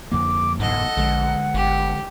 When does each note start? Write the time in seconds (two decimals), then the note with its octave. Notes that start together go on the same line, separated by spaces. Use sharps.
0.12 F2 D3 A#3 D6
0.60 F#1 B1 E2 G#2 A4 D#5 F#5
0.97 A#1 D3 G#3
1.54 G1 G4